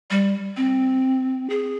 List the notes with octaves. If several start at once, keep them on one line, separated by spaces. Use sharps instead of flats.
G3
C4
G#4